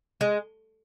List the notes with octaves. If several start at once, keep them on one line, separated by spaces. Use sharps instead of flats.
G#3